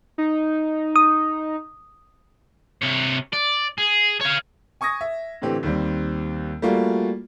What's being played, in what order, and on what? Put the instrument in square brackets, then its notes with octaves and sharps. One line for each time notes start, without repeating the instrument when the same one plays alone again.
[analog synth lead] D#4
[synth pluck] D#6
[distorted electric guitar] C3 C#5
D5
G#4
C#5 F5
[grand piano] G#5 C#6 D#6 G#6 A#6
E5
A2 D3 E3 C4 G4
D#2 G3 C4
G3 A3 A#3 F4 F#4